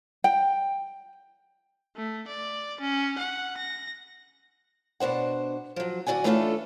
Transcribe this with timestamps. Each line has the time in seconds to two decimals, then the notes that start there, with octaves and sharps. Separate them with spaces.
0.24 G5
1.96 A3
2.28 D5
2.81 C#4
3.18 F#5
3.57 A#6
5.00 B2 D4 C5 F#5
5.76 F3 F#3
6.07 D3 F#4 D5 F#5 G#5
6.24 E3 A3 C#4 D4 F4 A4